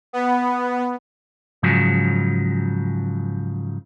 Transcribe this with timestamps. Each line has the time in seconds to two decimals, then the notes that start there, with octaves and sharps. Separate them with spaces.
0.13 B3
1.63 G#2 C#3 F3 F#3